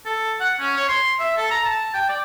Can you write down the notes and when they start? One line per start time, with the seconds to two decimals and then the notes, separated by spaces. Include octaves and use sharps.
0.06 A4
0.40 F#5
0.59 C#4
0.77 C#5
0.89 C6
1.19 E5
1.37 A4
1.50 A#5
1.65 A5
1.94 G5
2.09 D5